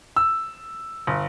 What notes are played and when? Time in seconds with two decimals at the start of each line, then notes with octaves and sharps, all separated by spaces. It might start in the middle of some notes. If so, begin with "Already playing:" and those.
0.16 E6
1.07 G1